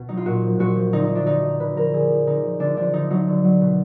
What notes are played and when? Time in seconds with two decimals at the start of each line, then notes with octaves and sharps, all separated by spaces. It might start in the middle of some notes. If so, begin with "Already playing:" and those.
Already playing: B2
0.09 F#3 D#4
0.17 F4
0.26 A#2 F#4
0.42 F3
0.59 A#2 F#4
0.76 F3
0.93 D3 D#4
1.04 D#4
1.10 F3
1.15 D4
1.26 D3 D#4
1.43 F3
1.60 D3 B4
1.76 F3 A#4
1.93 D3 G#4
2.10 F3
2.26 D3 D#4
2.43 F3
2.60 D3 D4
2.77 F3 D4
2.93 D3 D#4
3.10 F#3 D#4
3.28 D3
3.44 F#3
3.61 B2